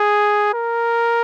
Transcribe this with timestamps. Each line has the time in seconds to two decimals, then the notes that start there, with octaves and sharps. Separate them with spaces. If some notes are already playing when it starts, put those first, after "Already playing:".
Already playing: G#4
0.54 A#4